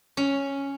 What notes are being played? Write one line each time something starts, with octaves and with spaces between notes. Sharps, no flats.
C#4